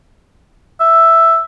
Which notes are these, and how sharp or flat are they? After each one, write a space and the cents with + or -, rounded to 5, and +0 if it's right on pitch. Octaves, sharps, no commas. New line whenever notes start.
E5 +5